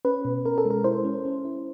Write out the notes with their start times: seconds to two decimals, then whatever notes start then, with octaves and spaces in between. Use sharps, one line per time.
0.05 C#4 B4
0.25 B2
0.45 C#4 A#4
0.58 A4
0.65 G#3
0.70 A#4
0.84 E4 C5
1.05 C#4
1.25 C#4
1.45 E4